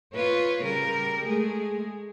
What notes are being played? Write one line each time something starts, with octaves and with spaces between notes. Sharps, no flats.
F4 B4 C#5
C#3 G3 A#4
G#3 A3 G#4